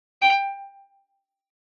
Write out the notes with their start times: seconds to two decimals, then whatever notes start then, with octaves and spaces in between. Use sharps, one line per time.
0.22 G5